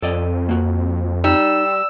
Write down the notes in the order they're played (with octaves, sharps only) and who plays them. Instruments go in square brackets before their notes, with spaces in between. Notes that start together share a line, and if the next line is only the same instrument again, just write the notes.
[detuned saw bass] F2 [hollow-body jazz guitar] A4 D5 D#5
[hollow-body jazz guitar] A#3 F#4
[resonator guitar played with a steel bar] G3 [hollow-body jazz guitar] D#4 [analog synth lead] E6